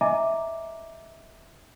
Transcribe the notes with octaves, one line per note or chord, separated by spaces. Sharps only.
D#5 E5 G#5 A#5 D6